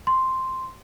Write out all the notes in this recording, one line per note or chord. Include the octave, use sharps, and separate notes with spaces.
C6